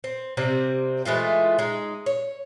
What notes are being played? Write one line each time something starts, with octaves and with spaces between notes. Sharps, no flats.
C4
C3 G3 C4
E3 G#3 A3 F4
G#3 D#4
C#5